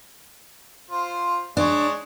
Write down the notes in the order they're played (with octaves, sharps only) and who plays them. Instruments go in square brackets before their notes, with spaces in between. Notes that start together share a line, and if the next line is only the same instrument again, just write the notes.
[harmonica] F4 C5
[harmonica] G#3 C#5 [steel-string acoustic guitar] D4